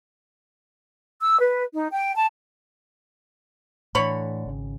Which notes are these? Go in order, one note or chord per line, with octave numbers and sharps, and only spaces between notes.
E6
B4
D#4
G5
A5
A2 D3 E3 C#5 B5
G#1 C#3